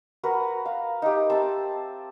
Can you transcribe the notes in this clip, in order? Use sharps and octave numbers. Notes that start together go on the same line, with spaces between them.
F#4 A#4 B4
F5
D#4 G4
C4 C5 E5 A5